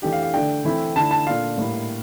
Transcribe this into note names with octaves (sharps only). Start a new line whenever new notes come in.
E3 A3 D4 G4
F5
F5
D3 A3 D4 G5
E3 A3 C4 E4
D3 A3 E4 A5
A5
A#2 A3 D4 F4 F5
A2 G3 A#3 E4